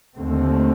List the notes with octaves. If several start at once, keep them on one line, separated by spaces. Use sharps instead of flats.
D#2 D3 A3 C4